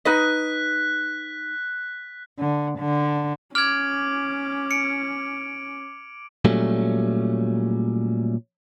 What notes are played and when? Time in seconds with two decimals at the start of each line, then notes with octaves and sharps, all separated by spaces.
0.05 D#4 B4 D#5 F#6 B6
2.38 D3
2.78 D3
3.55 C#4 D6 F6 G#6 D7 F#7
4.71 C#7 D7
6.45 A#2 F#3 G3 A3 C#4